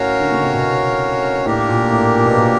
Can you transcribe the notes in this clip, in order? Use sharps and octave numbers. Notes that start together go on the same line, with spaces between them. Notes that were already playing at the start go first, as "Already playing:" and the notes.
Already playing: A2 C#4 F#4 A#4 C#5 F5
D3
C#3
C3
B2
A2 A#3 D4 G4 A#4
A#2
A#2
A2
A#2
B2
A#2